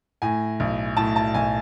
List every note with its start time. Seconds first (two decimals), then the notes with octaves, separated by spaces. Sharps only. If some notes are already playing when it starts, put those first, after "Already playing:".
0.22 A2 G#5
0.60 B1
0.97 A2 A5
1.16 A5
1.34 B1 G#5